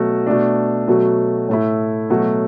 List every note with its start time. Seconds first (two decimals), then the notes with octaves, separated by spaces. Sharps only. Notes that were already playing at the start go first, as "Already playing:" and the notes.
Already playing: B2 F#3 A3 F#4
0.26 B2 A3 D4
0.88 B2 F#3 A3
1.49 A2 A3 E4
2.10 B2 F#3 A3 F#4